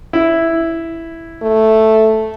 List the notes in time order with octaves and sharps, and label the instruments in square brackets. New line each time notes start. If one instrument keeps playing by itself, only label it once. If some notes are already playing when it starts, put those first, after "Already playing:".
[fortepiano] E4
[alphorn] A3